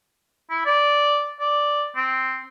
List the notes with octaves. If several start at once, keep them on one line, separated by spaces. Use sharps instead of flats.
E4
D5
D5
C4